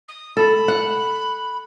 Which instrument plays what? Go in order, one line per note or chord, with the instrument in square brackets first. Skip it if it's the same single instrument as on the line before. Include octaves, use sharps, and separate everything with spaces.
[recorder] D#6
[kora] A4 [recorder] B5
[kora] F#5